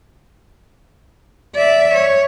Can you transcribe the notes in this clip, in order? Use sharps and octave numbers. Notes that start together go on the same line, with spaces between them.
D5 E5
C#5